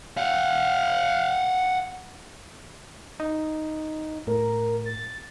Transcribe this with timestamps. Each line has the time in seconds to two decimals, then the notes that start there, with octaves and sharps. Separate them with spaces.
0.17 F5 F#5
3.20 D#4
4.27 A2 A#4
4.86 A6